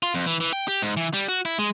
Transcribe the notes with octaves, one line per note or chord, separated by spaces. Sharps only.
F4
F2
E3
E3
G5
G4
G#2
E3
G3
F#4
E4
G#3